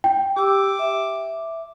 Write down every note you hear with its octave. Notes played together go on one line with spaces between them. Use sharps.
G5
G4 D6 E6
E5